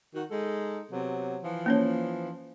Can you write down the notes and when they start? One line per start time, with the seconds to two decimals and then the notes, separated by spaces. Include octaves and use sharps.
0.15 D#3 F#4
0.31 G#3 D#4 A4
0.91 C3 F#3 B3
1.44 E3 F3
1.66 A#3 C#4 C#5